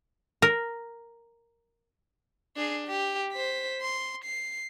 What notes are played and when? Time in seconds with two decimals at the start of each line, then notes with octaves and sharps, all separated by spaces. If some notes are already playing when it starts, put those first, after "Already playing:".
0.42 A#4
2.56 D4 G#4
2.87 G4
3.33 C5 B6
3.82 C6
4.25 C7